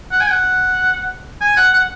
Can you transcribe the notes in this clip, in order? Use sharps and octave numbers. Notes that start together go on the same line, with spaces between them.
F#5
G#5
F#5
G#5
F#5
F#5